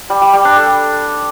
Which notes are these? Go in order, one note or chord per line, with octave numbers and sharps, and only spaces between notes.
G3
G4
G3
D4
A4